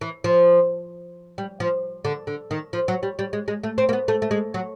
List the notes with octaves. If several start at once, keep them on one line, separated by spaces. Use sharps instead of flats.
E3
F3
G3
F3
D3
D3
D#3
F3
F#3
G3
G3
G#3
G#3
A3
C4
A#3
B3
A3
A3
G#3
F#3